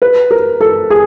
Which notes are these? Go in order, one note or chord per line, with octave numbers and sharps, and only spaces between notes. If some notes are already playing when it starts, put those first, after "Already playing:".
B4
A#4
A4
G#4